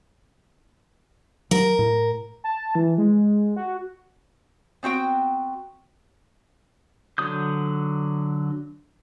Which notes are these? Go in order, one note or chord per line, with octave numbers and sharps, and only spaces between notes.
F#3 A#4
A2
A5
E3
G#3
F#4
B3 C4 F#4 G5
D3 F#3 D#6 G6